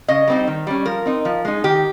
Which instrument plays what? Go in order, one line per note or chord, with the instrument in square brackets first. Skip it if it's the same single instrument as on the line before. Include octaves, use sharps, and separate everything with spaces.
[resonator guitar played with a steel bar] C#3 D#5
G3 C4 D#4
D#3
G3 C#4
F3 A#4
C4 D#4
F3
G#3 D#4
D#3 G4